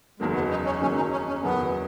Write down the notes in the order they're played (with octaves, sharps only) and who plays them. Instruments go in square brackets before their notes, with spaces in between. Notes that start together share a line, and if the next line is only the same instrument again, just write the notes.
[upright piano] F#1 E2 D#3 F#3 A#3 [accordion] G#3
[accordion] B3
D#4
C#4
[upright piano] F#1 E2 D#3 F#3 A#3 [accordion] C#4
[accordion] D#4
C#4
C#4
[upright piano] F#1 E2 D#3 F#3 A#3 [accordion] B3